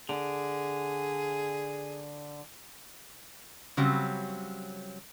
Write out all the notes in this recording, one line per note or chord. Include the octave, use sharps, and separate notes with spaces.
D3 G#4
C#3 F#3 G3 C4